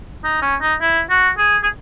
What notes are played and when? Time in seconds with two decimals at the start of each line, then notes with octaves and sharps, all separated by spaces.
0.24 D#4
0.42 C#4
0.61 D#4
0.81 E4
1.10 F#4
1.38 G#4
1.63 G#4